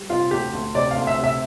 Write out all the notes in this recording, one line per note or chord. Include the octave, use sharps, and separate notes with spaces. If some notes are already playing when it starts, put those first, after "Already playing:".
Already playing: G3
C3 F4
D2 G4
D2
C3 D5
F5
D2
E5
C3 E5